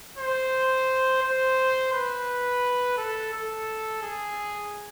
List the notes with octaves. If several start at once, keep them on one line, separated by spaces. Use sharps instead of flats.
C5
C5
B4
A4
A4
G#4